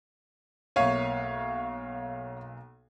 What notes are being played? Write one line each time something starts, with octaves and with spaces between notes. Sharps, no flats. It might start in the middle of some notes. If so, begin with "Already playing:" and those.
B1 A#3 C#5 E5 F5 D#7